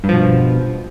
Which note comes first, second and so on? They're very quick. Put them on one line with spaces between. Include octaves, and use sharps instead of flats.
G2 F3 B2